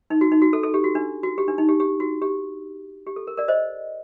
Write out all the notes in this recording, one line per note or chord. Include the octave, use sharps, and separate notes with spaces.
D#4
F#4
D#4
F#4
A4
A4
G4
F#4
D4
F#4
G4
D4
D#4
G4
G4
F#4
G4
G4
A4
A#4
A#4 D5
C5 D#5